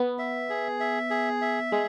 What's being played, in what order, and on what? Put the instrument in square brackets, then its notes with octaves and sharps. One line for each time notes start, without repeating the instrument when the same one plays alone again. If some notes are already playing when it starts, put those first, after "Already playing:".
Already playing: [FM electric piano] B3
[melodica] E5
G#4
E5
G#4
E5
[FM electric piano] G#3 [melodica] G#4